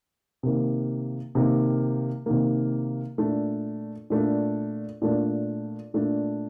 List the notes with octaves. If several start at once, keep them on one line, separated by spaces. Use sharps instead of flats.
C3 D#3 A#3
C3 D#3 A#3
C3 D#3 A#3
A#2 A3 D4
A#2 A3 D4
A#2 A3 D4
A#2 A3 D4